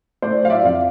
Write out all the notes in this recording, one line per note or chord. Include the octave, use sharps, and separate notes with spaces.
A3 C5 D5
F#3 F5
D5 E5
F2 F5